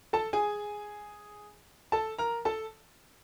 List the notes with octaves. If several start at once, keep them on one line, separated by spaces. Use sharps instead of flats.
A4 A5
G#4 G#5
A4 A5
A#4 A#5
A4 A5